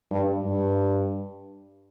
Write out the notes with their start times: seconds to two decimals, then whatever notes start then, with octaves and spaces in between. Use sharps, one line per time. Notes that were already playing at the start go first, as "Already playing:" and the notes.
0.11 G2
0.43 G2